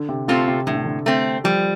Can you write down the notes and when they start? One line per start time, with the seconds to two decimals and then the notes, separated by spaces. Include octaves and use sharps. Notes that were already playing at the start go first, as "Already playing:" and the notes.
Already playing: D3
0.09 C3
0.28 C3 A3 C4 F4 A4
0.48 C3
0.67 A2 D3
0.75 C3
0.85 D3
1.06 A3 C4
1.44 F3 G3